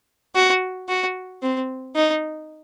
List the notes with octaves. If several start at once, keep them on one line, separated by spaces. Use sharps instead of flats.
F#4
F#4
C4
D#4